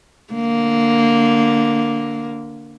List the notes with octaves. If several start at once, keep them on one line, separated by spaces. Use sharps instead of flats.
D3 A#3